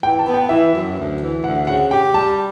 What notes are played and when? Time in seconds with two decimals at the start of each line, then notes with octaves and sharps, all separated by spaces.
0.02 E3 G5
0.19 A5
0.27 B3
0.34 G5
0.49 E3 E5
0.73 F#2
0.96 D2
1.20 E3
1.44 D2 F#5
1.67 C#3 F#5
1.91 G4 G5
2.14 G3 A5